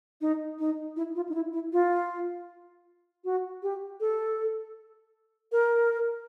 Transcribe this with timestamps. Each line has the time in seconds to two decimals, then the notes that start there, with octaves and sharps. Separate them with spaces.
0.21 D#4
0.59 D#4
0.96 E4
1.16 F4
1.29 D#4
1.34 E4
1.53 E4
1.73 F4
3.25 F#4
3.63 G4
4.00 A4
5.52 A#4